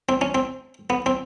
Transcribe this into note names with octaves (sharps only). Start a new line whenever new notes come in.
C4
C#4
C4
B3
C4